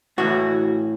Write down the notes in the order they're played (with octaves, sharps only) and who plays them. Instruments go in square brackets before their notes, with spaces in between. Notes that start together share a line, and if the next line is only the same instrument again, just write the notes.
[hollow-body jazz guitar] A2 E3 F#4